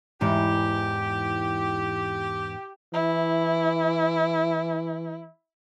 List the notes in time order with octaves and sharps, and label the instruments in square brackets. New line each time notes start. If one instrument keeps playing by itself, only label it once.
[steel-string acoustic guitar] E2 G#2 E3 [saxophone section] G4
[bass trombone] E3 [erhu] E4